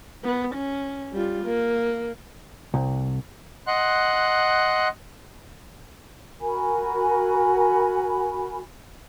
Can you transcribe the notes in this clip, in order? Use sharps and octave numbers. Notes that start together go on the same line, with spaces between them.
B3
C#4
G3 F4
A#3
C2
D#5 F#5 C6 F#6
F#4 A#4 G#5 B5